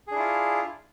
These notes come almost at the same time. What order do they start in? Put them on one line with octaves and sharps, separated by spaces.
G#4 D4 E4 F4